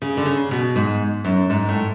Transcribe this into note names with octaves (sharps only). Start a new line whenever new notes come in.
C#3
D3
C#3
B2
G#2
F#2
G#2
A2